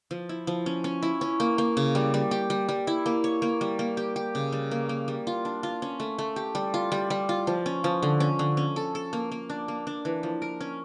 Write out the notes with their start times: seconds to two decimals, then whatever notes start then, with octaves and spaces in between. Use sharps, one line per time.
0.11 F3
0.29 E4
0.47 F3
0.66 C#4
0.84 C#4
1.03 E4
1.21 C#4
1.40 A#3
1.58 A#3
1.77 C#3
1.95 G3
2.14 G3
2.31 G4
2.50 G3
2.69 G3
2.87 E4
3.06 A#3
3.24 C#5
3.42 A#3
3.61 G3
3.79 A#3
3.97 G4
4.16 G4
4.35 C#3
4.52 G3
4.71 A#3
4.89 A#3
5.08 G3
5.27 F4
5.45 D4
5.63 F4
5.82 C#4
6.00 A3
6.18 A3
6.36 G4
6.55 G3
6.74 F4
6.92 G3
7.10 G3
7.29 F4
7.47 F3
7.66 C#4
7.84 F3
8.03 D3
8.20 C#4
8.39 D3
8.57 C#4
8.76 A4
8.95 A4
9.13 A#3
9.32 A#3
9.50 D4
9.68 A#3
9.87 D4
10.05 E3
10.23 F3
10.42 A#4
10.61 C#4